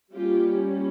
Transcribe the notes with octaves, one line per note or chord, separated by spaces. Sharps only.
G3 A#3 C#4 F4 G4